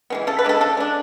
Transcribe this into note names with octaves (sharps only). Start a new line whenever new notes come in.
E3 G#3 B3
C#3 A4
B4
G#3 D4 A4
C#3 A4
G#3 D4